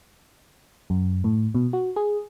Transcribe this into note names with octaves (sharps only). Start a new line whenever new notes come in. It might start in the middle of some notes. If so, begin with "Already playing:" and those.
F#2
A2
B2
F#4
G#4